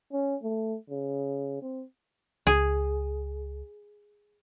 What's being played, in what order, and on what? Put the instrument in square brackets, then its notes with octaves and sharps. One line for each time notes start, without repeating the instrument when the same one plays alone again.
[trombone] C#4
A3
C#3
C4
[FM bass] C#2 [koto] G#4